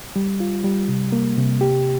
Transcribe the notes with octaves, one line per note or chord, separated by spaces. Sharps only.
G3
F4
G3
C3
A#3
C3
G4